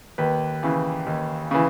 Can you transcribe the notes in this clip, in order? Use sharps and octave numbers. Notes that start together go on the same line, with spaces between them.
D#2 B4
C#3 E3
D#2
C#3 E3